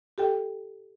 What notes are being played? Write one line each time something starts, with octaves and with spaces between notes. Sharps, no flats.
G4 A4 G5